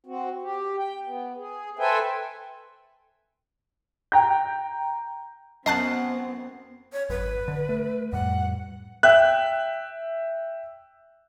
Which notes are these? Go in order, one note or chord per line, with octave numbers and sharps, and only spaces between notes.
C4 F#4
G4
G5
B3
G#4
A4 B4 C5 E5 G5 G#5
G5 A#5 G6
F#2 B3 C4 D#5 A5 F#6 C7
C#5
G#1 F#2 B4
D3
A3
F2 A2 G3 F#5
E5 G5 F#6